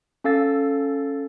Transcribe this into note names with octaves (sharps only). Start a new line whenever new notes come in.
C#4 A4 F5 E6 A6